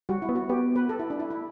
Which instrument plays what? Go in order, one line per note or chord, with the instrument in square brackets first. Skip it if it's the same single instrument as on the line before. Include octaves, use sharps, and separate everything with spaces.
[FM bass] G3 [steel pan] F#4
[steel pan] E4
[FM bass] B3
[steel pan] F#4
[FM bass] B3 [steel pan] G4
[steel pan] B4
A4
E4
D4
E4
E4